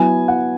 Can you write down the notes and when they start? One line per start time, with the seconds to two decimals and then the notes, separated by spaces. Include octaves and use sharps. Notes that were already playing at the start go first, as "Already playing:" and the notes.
Already playing: F#3 B3 E4 G#5
0.28 F#5